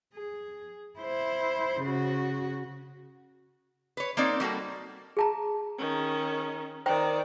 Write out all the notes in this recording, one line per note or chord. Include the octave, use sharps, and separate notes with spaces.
G#4
E4 C5
C#3 F#4
B4 C#5
A#3 C4 D#4 D5
G3 A#3 F#4 A4
G#4 A5 A#5
D#3 C#4
D#3 C5 D5 G5 A#5